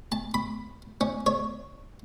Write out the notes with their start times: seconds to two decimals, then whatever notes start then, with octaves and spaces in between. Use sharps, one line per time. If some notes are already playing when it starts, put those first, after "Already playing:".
0.12 A5
0.34 B5
1.01 C#4
1.26 C#5